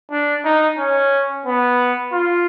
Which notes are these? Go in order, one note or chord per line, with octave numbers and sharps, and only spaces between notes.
D4
D#4
C#4
B3
F4